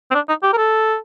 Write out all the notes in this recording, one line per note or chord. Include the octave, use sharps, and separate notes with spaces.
C4
D4
D#4
G4
A#4
A4